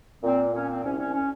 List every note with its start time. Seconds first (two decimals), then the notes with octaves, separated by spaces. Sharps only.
0.23 A#2 C4
0.53 A#2 C#4
0.68 C4
0.84 C2 C#4
0.99 C#4
1.13 C#4